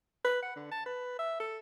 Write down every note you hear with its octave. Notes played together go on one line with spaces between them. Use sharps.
B4
F#5
D3
A5
B4
E5
A4